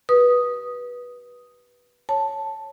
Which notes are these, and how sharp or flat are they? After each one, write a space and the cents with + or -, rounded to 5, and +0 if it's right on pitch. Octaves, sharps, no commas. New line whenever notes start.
G4 -30 B4 -15 D#6 +0
C#5 +0 A5 +0